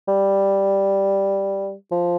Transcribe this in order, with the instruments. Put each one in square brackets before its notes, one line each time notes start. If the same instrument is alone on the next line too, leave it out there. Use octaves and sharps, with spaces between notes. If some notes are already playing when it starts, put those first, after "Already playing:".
[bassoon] G3
F3